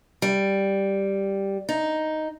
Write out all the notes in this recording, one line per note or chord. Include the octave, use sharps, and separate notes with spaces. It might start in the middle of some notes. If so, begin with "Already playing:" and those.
G3
D#4